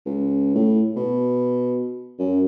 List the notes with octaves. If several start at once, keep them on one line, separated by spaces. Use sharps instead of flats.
C#2
A2
B2
F#2